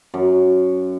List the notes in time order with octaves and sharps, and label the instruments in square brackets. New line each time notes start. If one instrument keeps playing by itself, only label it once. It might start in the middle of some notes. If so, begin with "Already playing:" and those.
[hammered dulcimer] F#2